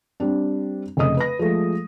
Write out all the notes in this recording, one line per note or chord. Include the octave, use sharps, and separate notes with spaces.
G3 C4 D4
F1 C#3 D#5 D#6
B4 A#6
F3 G#3 A3